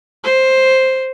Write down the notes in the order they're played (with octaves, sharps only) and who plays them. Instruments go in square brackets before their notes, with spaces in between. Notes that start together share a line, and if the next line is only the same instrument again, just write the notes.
[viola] C5